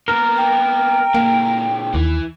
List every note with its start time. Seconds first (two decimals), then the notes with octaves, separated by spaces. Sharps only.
0.08 A#3 B3 A#4
0.37 G5
1.14 A#2 G#3 A#3
1.94 D#2 E3